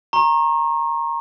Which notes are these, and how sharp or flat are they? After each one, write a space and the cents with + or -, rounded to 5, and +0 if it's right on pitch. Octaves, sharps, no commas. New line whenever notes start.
A#5 +0 C#6 -40